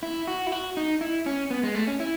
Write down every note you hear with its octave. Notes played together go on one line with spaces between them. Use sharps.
E4
F#4
E4
F#4
D#4
E4
C#4
B3
G#3
A3
C#4
E4